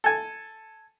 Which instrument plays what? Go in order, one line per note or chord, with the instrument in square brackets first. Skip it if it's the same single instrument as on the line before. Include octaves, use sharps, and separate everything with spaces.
[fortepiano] A4 G#5